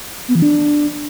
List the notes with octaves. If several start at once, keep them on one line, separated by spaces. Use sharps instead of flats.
B3
E3
D4